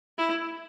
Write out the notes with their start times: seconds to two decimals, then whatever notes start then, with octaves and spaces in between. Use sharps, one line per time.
0.18 E4